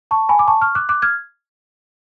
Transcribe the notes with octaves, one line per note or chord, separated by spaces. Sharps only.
A5 C#6
G#5 B5
D6
A5 C#6
C#6 F6
D6 F#6
D6 F#6
F6 G#6